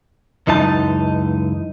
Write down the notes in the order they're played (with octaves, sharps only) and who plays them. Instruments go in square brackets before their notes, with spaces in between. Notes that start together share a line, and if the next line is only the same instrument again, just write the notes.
[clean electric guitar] C#2 F#2 E3 D#4 A5